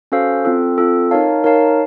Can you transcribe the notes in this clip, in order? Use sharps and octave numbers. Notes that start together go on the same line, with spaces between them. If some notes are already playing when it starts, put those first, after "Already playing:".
C#4 F#4 A4 C5 F5
C4 F4 A4
C4 F4 A4
D#4 A#4 C#5 F5 A5
D#4 A#4 C#5 F5 A5